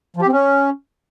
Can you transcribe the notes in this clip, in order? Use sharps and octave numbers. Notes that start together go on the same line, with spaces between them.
F3
G4
C4
C#4